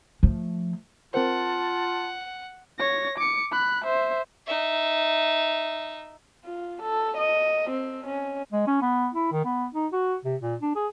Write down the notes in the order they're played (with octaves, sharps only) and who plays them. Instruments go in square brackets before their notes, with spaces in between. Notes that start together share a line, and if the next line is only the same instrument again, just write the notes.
[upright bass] F3 A3
[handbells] C4 A#4 C5 [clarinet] F4 [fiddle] F#5 [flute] A5
[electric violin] C#5 A#6
D6 C#7
B5 F#6
C5 E5
[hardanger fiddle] D#4 E5
[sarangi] F4
A4
D#5
C4
C#4
[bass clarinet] G#3
C#4
B3
E4
D#3
B3
D#4
F#4
C3
A#2
D4
G#4